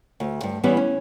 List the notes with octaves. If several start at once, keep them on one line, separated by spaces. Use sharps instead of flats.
D2
G2
E2 E3 G3 B3 C#4
C#4